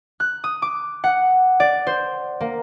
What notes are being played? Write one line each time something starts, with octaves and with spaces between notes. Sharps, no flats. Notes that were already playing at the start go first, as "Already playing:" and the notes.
F#6
D#6
D6
F#5
D5
C5
A#3